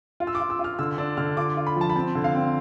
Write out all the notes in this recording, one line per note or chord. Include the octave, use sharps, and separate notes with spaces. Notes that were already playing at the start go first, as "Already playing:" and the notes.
F4
E6
D6
F4
E6
F4
F6
D3 E6
D4 E6
D3 F6
F4 D6
F4
B5
F3 A5
B5
C4 A5
D3
F5
C4